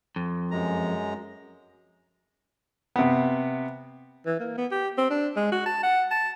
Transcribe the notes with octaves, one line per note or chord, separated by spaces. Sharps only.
F2
F#2 G#3 A#5
C3 B3
E3
A#3
B3
G4
C4
D4
G#3
F#4
A5
F#5
A5